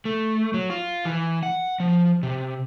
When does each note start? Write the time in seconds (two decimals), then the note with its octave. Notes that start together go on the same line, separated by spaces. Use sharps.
0.05 A3
0.54 F#3
0.70 F4
1.05 E3
1.43 F#5
1.80 F3
2.23 C3